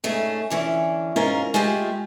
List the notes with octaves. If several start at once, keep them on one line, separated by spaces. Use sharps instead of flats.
G#2 A3 C#4 G#4
D3 E3 C#4
G#2 C#4 F4 A#4 F5
G#3 A3 F4 G4 G#4